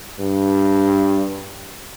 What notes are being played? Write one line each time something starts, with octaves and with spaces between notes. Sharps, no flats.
G2